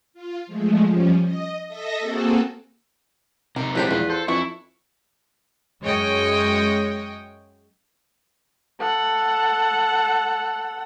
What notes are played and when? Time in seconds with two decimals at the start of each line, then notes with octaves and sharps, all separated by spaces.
0.14 F4
0.47 F3 G#3 A3
0.86 F3 G3 C#4
1.23 D#5
1.67 A4 D#5 E5 A#6
2.00 A#3 C4 F#4 G#4 A4
3.56 C3 D#4 A#4
3.75 C2 F3 F#3 G#3 D4 G4 B4 C5
3.91 E2 F4
4.10 A4 C5
4.28 F2 E3 D4 E4 C#6
5.81 F#2 G#3 C#5 D#5 G5
8.81 A4 F#5